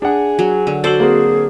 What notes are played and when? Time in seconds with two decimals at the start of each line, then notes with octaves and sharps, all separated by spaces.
0.02 D4 G#4 F#5
0.39 F#3
0.67 D3
0.84 F#4 A4 C5 D5 E6 F#7
1.00 A#3 C4 G#4